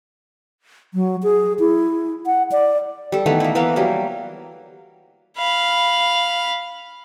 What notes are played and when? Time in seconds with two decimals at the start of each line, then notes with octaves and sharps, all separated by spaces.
0.94 F#3
1.23 G#4
1.60 E4
2.26 F#5
2.52 D5
3.12 G3 A4
3.26 D#3 E3 A3 B3
3.40 A#3 E4
3.55 E3 A#3 B3 F5
3.76 F#3 G3 A#3
5.37 F5 B5